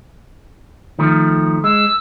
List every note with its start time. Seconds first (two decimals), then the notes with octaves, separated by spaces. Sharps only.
0.99 D#3 F3 A3
1.64 G#3 E6